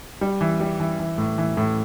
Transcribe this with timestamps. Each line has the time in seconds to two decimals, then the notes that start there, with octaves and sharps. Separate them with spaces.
0.21 G3
0.41 E3
0.60 G3
0.80 E3
0.99 E3
1.18 A2
1.38 E3
1.57 A2